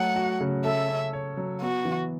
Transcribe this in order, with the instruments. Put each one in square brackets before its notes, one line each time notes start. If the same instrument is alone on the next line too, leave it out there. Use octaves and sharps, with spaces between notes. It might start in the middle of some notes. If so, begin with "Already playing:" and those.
Already playing: [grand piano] F#3 A3 [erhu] F#5
[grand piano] F#4
C#3
[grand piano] A4 [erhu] E5
[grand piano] C#4
C#5
F#3
[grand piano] B3 [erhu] F#4
[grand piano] E3